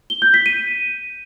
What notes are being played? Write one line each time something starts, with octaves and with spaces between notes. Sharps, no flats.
G7
G6
B6
D#7